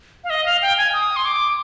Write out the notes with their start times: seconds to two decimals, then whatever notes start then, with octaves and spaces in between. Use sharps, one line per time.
0.24 F5
0.30 D#5
0.46 F5
0.62 G5
0.78 G#5
0.93 D#6
1.16 C6
1.25 D6